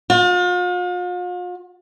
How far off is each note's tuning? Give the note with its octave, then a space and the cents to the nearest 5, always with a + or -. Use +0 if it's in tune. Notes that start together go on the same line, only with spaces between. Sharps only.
F4 +40